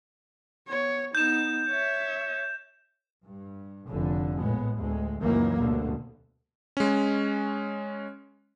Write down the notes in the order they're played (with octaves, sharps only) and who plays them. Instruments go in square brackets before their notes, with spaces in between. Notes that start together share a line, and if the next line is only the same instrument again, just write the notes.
[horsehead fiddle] B3 C#5
[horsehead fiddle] B3 D#4 [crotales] G6 E7
[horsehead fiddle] C#5 E5
[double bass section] G2
F1 D3
A#1 A2 G#3 B3
D2 G#3
C#2 F#2 D#3 E3 F#3 A#3
D2 G2 B2 D3
[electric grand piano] G#3 C#4